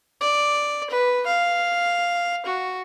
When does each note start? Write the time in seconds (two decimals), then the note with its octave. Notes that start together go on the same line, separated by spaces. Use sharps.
0.21 D5
0.90 B4
1.26 F5
2.46 F#4